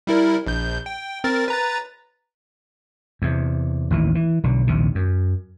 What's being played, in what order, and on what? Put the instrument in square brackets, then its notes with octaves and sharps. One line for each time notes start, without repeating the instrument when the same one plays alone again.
[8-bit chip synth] G3 E4 A#4
A#1 G6
G5
C4 A#4 A6
B4 A#5 A6
[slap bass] E2 C3
A1 D#2 E3
E3
B1 D3
A#1 D#2 C3
F#2